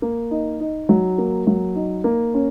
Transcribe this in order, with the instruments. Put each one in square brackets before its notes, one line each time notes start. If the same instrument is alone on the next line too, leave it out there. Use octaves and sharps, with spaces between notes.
[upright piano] A#3
D#4
D#4
F#3
A#3
F#3
D#4
A#3
C#4